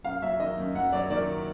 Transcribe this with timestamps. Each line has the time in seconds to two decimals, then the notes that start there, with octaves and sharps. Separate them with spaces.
0.04 F#2 F5
0.22 F#3 E5
0.39 D#3 D#5
0.58 F#2
0.75 F#2 F#5
0.92 F#3 D5
1.10 D#3 D5